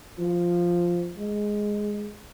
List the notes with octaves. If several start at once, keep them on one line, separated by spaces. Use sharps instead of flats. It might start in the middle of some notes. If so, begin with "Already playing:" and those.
F3
G#3